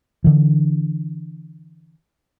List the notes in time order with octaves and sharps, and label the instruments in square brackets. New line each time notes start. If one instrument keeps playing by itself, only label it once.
[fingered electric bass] D3 E3